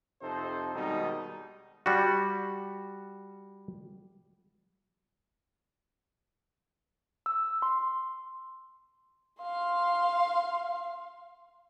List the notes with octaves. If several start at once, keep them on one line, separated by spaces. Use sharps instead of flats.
F2 C3 D#4 A4 C5
B2 D#3 G3 G#3 D#4
G3 F#4
E6
C6
F5 C6